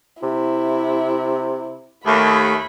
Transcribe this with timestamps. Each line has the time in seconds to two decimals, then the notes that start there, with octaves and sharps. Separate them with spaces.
0.23 C3 E4
2.06 D#2 A3 B5